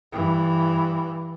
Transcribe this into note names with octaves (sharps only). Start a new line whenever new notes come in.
G2 E3